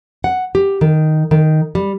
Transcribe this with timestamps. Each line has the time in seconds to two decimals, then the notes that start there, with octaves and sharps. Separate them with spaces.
0.24 F#5
0.55 G4
0.81 D#3
1.31 D#3
1.75 G3